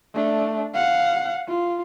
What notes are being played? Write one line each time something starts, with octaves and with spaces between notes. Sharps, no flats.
A3 D4
F5 F#5
F4